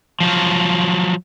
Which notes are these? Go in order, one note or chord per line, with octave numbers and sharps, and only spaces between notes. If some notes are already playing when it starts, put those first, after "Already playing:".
F3 F#3